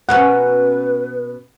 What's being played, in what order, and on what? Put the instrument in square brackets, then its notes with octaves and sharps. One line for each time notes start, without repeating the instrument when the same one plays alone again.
[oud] B2 A#3 C#4 [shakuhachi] B4 [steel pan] F#5